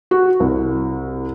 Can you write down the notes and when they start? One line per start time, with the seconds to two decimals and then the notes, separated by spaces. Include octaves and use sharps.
0.11 F#4
0.40 C2